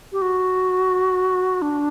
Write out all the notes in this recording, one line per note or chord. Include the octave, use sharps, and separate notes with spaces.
G4
F#4
D4